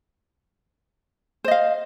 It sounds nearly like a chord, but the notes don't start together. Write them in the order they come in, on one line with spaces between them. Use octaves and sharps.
C5 D#5 F5